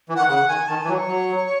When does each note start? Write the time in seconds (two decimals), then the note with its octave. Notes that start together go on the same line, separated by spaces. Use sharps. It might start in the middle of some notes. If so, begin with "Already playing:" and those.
0.09 E3
0.16 D#3 F#5
0.29 C#3 F#5
0.48 D#3 G#5
0.68 D#3 A5
0.82 E3 G#5
0.88 F#3
0.95 C#5
1.08 F#3